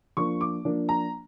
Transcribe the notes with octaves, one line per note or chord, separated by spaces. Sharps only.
F3 A#3 D4 C#6
D6
F3 A#3 D4
A#5